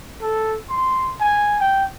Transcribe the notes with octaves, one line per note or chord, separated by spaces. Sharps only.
A4
C6
G#5
G5